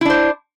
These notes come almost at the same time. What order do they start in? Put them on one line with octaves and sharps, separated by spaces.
E4 D4 C5